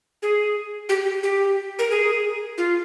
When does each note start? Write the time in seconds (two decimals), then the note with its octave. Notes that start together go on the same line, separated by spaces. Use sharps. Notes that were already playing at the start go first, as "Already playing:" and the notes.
0.23 G#4
0.89 G4
1.23 G4
1.79 A#4
1.91 G#4
2.58 F4